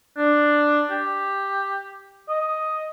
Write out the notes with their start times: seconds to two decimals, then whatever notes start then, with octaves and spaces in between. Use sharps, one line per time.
0.18 D4
0.91 G4
2.28 D#5